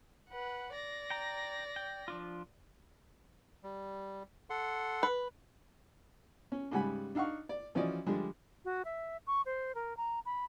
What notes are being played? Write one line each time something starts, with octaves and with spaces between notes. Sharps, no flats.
B4 F#5
D5 A#6
G5 A#5
G5
F3 D4 F4
G3
A4 F#5 C6
B4
C#4
G#2 C#3 G3 F#5 G#5 B5
D4 D#4 F5 F#5 C#6
D5
E3 F3 C#4 F#4 D5 D#5
D3 F3 G3 G#3 D4
F#4
E5
C#6
C5
A#4
A#5
B5